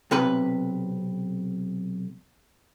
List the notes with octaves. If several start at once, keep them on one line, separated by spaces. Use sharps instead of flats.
B1 C3 B4